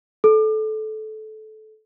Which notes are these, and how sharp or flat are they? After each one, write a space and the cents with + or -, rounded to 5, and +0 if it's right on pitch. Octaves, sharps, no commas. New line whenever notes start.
A4 -20